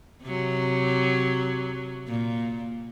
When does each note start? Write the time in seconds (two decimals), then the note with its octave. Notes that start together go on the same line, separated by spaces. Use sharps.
0.23 C3 F#3
2.08 A#2